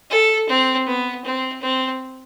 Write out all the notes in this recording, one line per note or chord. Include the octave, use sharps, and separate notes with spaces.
A4
C4
B3
C4
C4